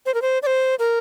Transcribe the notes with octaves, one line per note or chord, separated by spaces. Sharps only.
C5
A#4
C5
D5
C5
A#4